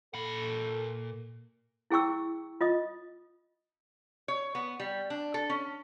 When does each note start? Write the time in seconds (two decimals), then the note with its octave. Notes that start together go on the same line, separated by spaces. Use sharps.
0.14 A#2 A4 B5
1.91 E4 G#4 G5 C#6 E6
2.61 F4 D#5 D#6
4.28 C#5
4.55 B3
4.80 G3
5.10 D4
5.34 A4
5.50 C#4